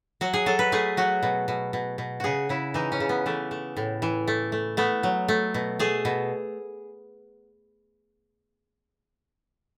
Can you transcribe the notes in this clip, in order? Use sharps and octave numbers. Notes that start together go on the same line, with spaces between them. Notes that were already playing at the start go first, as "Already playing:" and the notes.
F#3 F#4
G#4
F#3 A4
B4
A3 G#4
F#3 F#4
B2
B2
B2
B2
C#3 F#4 G#4
C#3 E4
E3 D#4
C#4
C#3
B3
E3 A3
A3
A2
E3
A3
A3
A3 B3
F#3
A3
B2
A3 G#4
B2